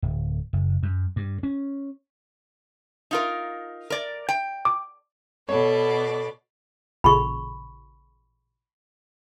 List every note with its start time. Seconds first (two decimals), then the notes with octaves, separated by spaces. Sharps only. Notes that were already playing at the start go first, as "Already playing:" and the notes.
0.02 D1
0.53 F#1
0.83 F#2
1.16 G2
1.43 C#4
3.11 D#4 F4 A#4
3.90 A#4 D5
4.29 G5
4.65 D6
5.49 B2 B3 A4 C#5 D5
7.04 A1 A#2 C#3 B5 C#6